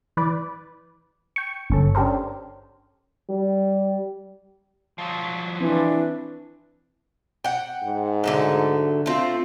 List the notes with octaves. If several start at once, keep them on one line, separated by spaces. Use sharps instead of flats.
E3 B4 D5
G5 C#6
G1 C#4 A4
C#4 D4 G4 A4 A#4 C5
G3
F3 F#3
E3 C4 D4
F#5 G5
G#2
D3 F#3 A3
A3 C4 F4